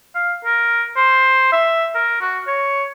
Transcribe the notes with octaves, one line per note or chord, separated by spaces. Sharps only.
F5
A#4
C5
E5
A#4
F#4
C#5